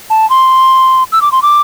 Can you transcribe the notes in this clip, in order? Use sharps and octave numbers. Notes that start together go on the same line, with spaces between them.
A5
C6
E6
D6
C6
D6